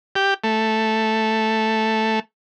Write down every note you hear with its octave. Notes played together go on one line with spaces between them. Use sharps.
G4
A3